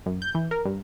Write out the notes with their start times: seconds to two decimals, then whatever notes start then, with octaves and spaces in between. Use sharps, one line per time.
0.06 F#2
0.22 G6
0.35 E3
0.51 A#4
0.65 G2